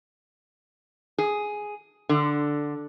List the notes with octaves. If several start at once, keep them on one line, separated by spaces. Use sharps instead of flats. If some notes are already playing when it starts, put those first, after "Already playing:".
G#4
D3